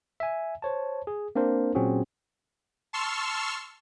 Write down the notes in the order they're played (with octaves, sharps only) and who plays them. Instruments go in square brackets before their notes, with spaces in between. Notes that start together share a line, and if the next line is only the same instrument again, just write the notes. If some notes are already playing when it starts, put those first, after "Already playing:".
[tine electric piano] E5 G#5
C5 C#5 A5
G#4
A#3 C4 D4 A#4 C5
A#2 F#3 C4 C#4 F#4 G#4
[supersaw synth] A5 C6 C#6 E6 F6